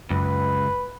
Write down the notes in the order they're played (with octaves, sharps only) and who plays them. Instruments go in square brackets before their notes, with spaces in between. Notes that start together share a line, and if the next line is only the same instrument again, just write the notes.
[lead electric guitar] C#2 [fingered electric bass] F#2 [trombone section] B4